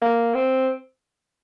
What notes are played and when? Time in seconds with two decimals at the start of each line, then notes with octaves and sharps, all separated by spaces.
0.02 A#3
0.34 C4